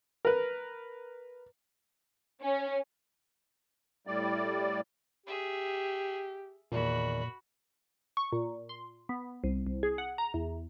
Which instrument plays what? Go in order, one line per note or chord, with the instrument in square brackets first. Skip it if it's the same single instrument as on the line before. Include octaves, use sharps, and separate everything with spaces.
[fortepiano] A#4 B4
[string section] C#4
[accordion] A2 G3 D5
[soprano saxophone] G4 [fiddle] G#4 E5
[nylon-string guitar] E2 D#3 [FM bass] A#2 [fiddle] F#4 B5
[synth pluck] C#6
A#2
C6
B3
C2
C2
G#4
F#5
A#5
E2